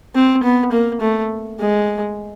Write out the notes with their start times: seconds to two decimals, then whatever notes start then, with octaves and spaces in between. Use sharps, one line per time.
0.15 C4
0.43 B3
0.72 A#3
1.01 A3
1.60 G#3